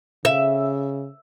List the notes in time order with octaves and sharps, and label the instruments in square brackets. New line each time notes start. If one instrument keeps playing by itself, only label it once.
[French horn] C#3 [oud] E5